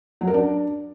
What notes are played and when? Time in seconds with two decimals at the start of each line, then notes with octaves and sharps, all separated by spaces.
0.21 F#3
0.27 A#4
0.34 D4